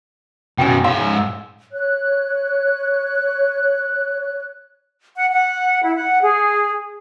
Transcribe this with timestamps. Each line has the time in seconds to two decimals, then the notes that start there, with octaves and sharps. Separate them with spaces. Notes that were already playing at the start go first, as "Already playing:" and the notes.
0.58 F#2 B2 G5 G#5
0.85 G#2 E5 F5 C6
1.72 C#5 F#6
5.15 F#5
5.31 F#5
5.83 E4
5.96 F#5
6.21 G#4